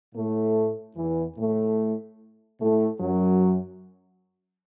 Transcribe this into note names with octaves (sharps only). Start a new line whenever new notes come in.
A2 A3
E2 E3
A2 A3
A2 A3
F#2 F#3